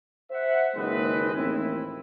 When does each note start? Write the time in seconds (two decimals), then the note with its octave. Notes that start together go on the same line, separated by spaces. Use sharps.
0.31 C5 E5 F#5
0.75 F#1 D#2 G#3 C4 B4 D#5
1.33 A1 D#2 C4 E4